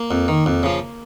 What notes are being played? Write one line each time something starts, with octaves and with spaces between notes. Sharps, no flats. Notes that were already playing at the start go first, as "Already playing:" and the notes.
Already playing: A#3
F2
D#3
F2
C#3 F3